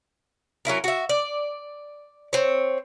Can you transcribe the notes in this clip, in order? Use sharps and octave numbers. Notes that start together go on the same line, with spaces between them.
F#3 C#4 E4 A#4
F#4 E5
D5
C4 C#5